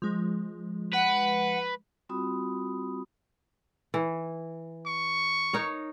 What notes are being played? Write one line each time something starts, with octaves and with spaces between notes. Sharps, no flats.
F3 G#3
B4 F#5
G3 C4 F4 F#4 B5 D#6
E3
C#6
D#4 A#4 C#5